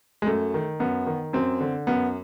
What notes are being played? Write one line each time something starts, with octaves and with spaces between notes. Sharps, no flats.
G#3
F#2 A3
D#3
F#2 B3
D#3
F#2 C4
D3
F#2 B3